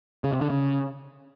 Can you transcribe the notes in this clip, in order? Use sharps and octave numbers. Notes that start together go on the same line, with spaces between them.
C#3
C3
D3
C#3